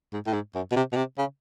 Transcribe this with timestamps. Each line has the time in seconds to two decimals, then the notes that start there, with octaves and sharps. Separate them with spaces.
0.13 G#2
0.26 A2
0.33 G#2
0.55 F#2
0.72 B2
0.76 C3
0.93 B2
0.96 C3
1.18 C#3